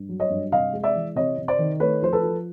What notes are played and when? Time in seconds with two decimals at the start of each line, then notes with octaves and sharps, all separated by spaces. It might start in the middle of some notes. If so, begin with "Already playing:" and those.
Already playing: G2
0.09 F#3
0.20 C#5 D#5
0.30 G2
0.52 C3 D#5 F5
0.73 G#3
0.83 D5 E5
0.95 E3
1.16 C3 C#5 D#5
1.38 C3
1.48 C5 D5
1.59 D#3
1.80 A3 B4 C#5
2.02 F3 C5
2.13 A4 B4
2.23 F3